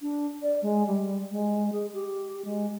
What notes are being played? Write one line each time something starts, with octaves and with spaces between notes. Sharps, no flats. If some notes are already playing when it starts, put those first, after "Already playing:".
D4
D5
G#3
G3
G#3
G#4
G4
G#3